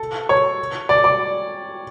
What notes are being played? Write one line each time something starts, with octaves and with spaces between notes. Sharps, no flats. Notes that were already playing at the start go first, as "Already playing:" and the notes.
Already playing: A4
C#5
D5
D5